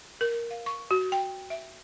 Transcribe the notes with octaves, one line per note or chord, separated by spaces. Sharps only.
A#4
F5
C#6
F#4
G5
E5